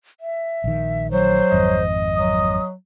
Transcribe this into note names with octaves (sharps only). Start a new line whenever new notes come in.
E5
A#1 D#3
F#3 C5
G#1 F2 D#5
F#3 D#6